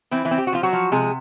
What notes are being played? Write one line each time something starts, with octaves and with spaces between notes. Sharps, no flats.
E3 C4 E4
E3 E4
C4
G4
F#4
F3 F4
F#3 F#4
F3
C3 G#3 G#4